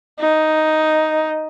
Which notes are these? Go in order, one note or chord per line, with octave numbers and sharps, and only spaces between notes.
D#4